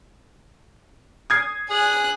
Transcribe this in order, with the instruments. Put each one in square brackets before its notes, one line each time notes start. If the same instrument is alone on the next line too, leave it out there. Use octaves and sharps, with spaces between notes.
[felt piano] D#6 G#6 C7
[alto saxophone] G#4 [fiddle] G#5 F#6